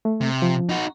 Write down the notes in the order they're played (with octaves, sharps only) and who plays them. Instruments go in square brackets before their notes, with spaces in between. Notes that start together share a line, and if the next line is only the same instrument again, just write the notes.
[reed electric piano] A3
[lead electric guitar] C3
[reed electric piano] F3
[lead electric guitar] D#4 F#4